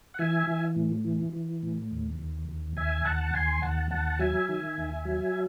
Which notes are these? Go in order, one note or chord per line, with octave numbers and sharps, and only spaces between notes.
F#5
E3 E5 G#5
E3
A2
E3
E3
A2
D#2
D#2
D#2
D#2 E5 G#5
D#2 F#5 A5
D#2 G#5 C6
D#2 F#5 A5
D#2 F#5 A5
F#3 E5 G#5
D#3
D#2
F#3